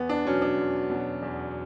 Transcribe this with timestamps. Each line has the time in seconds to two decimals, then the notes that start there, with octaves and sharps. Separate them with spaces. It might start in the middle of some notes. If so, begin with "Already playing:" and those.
Already playing: E2 B3
0.09 D4
0.25 B2 F#3 C#4
0.42 D4
0.58 E2
0.90 B2 F#3
1.22 E2